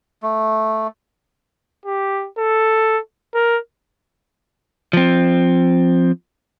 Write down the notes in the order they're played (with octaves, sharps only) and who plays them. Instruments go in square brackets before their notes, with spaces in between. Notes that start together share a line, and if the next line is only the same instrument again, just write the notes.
[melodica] A3
[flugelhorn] G4
A4
A#4
[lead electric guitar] F3 C4